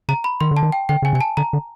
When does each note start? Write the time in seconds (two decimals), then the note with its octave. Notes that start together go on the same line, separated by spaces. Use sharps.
0.09 C#3 A#5
0.24 B5
0.40 D#3 C6
0.51 D3
0.57 A5
0.63 D#3
0.72 G5
0.89 D3 G5
1.02 C#3 G#5
1.13 C3 G#5
1.21 A5
1.37 D3 A#5
1.53 D3